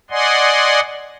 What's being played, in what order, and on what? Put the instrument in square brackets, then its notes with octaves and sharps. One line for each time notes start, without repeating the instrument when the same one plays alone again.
[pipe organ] D5 D#5 F#5 G#5 C6